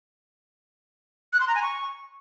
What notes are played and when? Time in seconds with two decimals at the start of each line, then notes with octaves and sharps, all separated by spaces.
1.33 F#6
1.40 C6
1.48 A#5
1.55 G#5
1.62 C#6